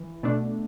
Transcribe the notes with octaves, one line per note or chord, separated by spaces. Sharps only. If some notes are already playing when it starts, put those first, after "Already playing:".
Already playing: E3
B2 A3 D4